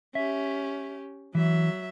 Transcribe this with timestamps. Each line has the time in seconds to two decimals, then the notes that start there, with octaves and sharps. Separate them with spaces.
0.15 C#4 G4 E5
1.35 E3 F#3 E5